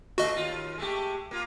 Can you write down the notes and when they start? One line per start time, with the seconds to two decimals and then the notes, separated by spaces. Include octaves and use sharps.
0.18 A#2 D3 A3 F#4 D#5
0.36 D#2 F4
0.78 G#3 A3 G4
1.31 A#3 F4